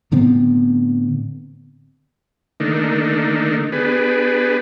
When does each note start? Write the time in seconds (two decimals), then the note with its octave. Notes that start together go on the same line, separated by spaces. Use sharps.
0.12 A2 D3 B3 C4
2.60 D3 D#3 A3 A#3 D4 D#4
3.72 B3 D4 G4 G#4 B4